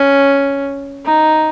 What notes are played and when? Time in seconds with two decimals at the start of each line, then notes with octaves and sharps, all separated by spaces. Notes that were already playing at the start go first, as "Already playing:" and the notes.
Already playing: C#4
1.06 D#4